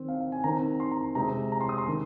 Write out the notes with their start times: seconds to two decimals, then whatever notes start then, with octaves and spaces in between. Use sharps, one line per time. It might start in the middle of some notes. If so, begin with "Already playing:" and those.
Already playing: D#3 C4
0.09 F5
0.21 F5
0.32 G#5
0.44 D#3 C4 A#5
0.80 C6
0.91 A#5
1.15 C3 G#3 C4 A#5
1.52 A#5
1.61 C6
1.69 D#6
1.78 C6
1.88 D#3